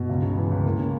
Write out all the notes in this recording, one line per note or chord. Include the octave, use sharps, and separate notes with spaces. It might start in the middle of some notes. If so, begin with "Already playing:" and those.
Already playing: G2 B2
C#2
C#3
E3
C#2
A#3
C#3